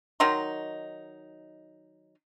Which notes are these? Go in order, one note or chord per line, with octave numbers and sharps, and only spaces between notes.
D#3 F#3 D#4 C6